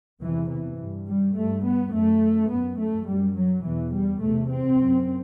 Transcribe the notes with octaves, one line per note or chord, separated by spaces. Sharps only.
E2 C3 E3
E3
G2
G3
G2 A3
B3
F#2 A3
F#2 B3
A3
F#2 G3
F#3
E2 B2 E3
G3
E2 C3 A3
C4
F#2